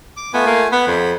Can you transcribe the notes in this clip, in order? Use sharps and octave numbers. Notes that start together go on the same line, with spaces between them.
D6
A3 B3 F4 G#5
A#3
B3 B5
F2